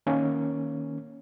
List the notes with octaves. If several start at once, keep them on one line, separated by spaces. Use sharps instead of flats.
D#3 A#3 C#4